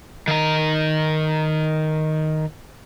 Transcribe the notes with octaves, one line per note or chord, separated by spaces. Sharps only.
D#3 A#5